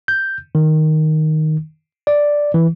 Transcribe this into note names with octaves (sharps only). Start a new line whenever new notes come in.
G6
D#3
D5
E3